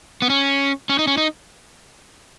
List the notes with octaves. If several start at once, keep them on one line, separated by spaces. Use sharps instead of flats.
B3
C#4
C#4
D#4
C#4
D#4